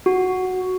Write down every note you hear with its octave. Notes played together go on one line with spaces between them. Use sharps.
F#4